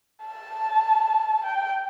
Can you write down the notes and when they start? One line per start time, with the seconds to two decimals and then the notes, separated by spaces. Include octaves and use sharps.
0.24 A5
1.44 G5